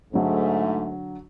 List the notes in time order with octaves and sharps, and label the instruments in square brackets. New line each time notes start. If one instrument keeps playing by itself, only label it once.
[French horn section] G#2 A3 [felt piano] D3 F#3